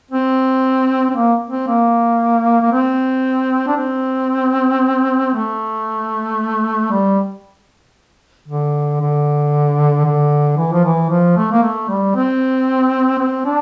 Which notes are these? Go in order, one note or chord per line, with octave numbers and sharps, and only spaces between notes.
C4
C4
A#3
C4
A#3
A#3
C4
D4
C4
A3
G3
D3
D3
D3
E3
F3
E3
F3
A3
A#3
A3
G3
C4
C4
D4